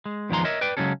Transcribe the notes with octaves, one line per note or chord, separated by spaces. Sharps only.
G#3
E2 D#3 F3 G#3 A#5 C6
A#4 C#5 D#5 E5
B4 D5 G5
C#3 F#3 G#3 C#4 A4